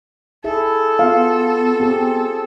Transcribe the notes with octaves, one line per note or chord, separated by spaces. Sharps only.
E4 G#4 A4 E5
B3 F4 F5
C4 G4 G#4